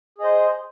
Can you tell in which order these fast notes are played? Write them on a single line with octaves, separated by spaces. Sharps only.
G#4 D#5 C5